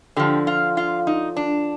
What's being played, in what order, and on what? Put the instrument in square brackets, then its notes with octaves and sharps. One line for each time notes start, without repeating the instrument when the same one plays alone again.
[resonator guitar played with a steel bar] D3 F3 G4
F4
F4
D#4
D4